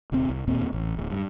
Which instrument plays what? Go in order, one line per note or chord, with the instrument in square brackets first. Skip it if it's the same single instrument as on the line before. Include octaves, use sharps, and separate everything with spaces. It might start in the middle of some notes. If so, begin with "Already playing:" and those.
[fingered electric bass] D#1 C3 D#3 C4
C2
E1 D#2 A#2 C4
A1
D1
G2